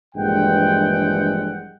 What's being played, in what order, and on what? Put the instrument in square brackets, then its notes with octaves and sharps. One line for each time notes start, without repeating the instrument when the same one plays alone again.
[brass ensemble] A#1 G2 E3 G#3 F#5 G5